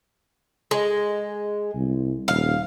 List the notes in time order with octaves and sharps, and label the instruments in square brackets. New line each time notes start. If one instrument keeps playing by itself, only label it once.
[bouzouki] G#3
[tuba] C2
[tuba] D#1 [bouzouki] F5